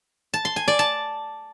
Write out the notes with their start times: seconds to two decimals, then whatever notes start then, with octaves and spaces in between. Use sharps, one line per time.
0.34 A5
0.45 C6
0.56 G#5
0.68 D5
0.79 A5